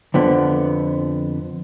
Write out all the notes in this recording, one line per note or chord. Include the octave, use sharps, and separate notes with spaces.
F2 D3 B3